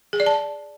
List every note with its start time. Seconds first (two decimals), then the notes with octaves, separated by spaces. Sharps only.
0.13 G#4
0.20 D5
0.26 A5